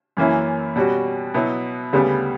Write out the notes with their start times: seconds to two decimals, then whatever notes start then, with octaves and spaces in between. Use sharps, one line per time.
0.17 F#2 E3 A#3 C#4 E4
0.76 B2 G3 C#4 F#4
1.34 B2 F#3 B3 E4
1.93 D2 C#3 G3 B3